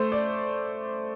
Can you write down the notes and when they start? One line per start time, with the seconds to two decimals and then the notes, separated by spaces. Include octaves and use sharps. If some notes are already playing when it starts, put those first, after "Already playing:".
Already playing: A3 C5
0.12 D5